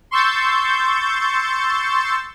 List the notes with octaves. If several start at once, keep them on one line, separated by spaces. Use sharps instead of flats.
C6 C#6 E6 G6 A6